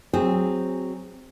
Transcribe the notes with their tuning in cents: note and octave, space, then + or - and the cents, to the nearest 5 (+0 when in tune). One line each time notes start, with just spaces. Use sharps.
F#3 +0 C4 -5 G#4 -20